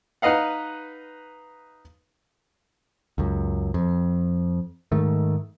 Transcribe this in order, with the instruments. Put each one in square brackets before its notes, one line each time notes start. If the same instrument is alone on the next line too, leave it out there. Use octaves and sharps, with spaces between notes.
[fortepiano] D#4 B4 D#5 F5 F#5
[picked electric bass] C#2 F#2
F2
G#2 D#3 A3